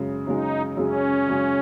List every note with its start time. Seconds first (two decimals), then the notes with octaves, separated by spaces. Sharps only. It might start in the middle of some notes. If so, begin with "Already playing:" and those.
Already playing: F#2 C#3 G#3
0.26 F#2 C#3 G#3 D#4
0.76 F#2 C#3 G#3 C#4
1.27 F#2 C#3 G#3